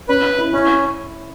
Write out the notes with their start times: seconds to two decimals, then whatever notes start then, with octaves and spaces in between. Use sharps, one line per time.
0.09 C#4 B4
0.23 C#4
0.38 E4
0.53 C#4 E4